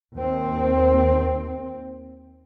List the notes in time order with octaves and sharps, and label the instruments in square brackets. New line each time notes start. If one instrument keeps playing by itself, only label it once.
[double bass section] D#2 C4